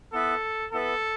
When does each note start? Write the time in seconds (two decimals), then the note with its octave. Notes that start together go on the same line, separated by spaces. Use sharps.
0.13 B3 E4 A4 B4
0.72 B3 E4 A4 B4